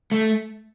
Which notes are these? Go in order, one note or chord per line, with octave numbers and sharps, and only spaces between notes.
A3